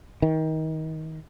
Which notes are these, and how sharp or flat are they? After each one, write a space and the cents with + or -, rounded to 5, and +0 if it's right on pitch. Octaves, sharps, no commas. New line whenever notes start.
D#3 +25